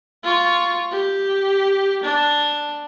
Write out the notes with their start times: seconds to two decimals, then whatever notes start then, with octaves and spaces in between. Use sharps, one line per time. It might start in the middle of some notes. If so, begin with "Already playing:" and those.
0.24 F4 C#6
0.91 G4
2.03 D4